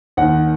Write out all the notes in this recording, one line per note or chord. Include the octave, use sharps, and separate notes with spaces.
D#2 D#3 F#5